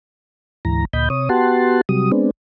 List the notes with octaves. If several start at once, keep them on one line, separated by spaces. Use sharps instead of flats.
D2 G#2 E3 A#5
D2 A#2 D#5 B5 G6
C3 C#5 D#6
B3 F#4 G4 F#5 A5 C6
C3 F#3 G3 D#6
G#3 B3 C4 D4